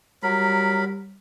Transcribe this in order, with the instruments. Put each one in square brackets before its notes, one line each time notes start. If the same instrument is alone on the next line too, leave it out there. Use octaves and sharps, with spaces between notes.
[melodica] F#3 A#4 B5 [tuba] G3